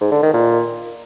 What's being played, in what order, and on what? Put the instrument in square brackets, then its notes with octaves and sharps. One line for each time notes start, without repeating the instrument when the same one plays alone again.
[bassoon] G#2
D3
D#3
A#2